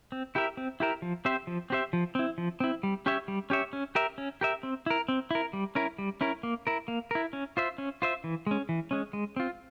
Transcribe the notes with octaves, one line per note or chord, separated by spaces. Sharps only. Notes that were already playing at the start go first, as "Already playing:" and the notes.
C4
E4 G4 A#4 E5
C4
E4 G4 A#4 E5
F3
C4 G4 C5 E5
F3
C4 G4 C5 E5
F3
C4 E4
F3
C4 E4
G3
C#4 G4 C#5 E5
G3
C#4 G4 C#5 E5
C#4
G4 A#4 E5
C#4
G4 A#4 E5
C4
E4 A#4
C4
E4 A#4
G3
C#4 E4 A#4
G3
C#4 E4 A#4
A#3
E4 A#4
A#3
E4 A#4
C#4
F4 C5 E5
C#4
F4 C5 E5
E3
G#3 C#4
E3
G#3 C#4
G#3
C4 F4